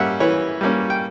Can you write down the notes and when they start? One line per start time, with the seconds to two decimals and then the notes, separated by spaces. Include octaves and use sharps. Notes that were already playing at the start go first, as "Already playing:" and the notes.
Already playing: G3 A#3 C#4 E5 F#5
0.20 E3 B4 C#5
0.61 G3 A#3 C#4
0.90 G5